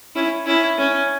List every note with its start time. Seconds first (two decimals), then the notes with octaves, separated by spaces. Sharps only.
0.15 C#4 E4
0.46 C#4 E4
0.78 C#4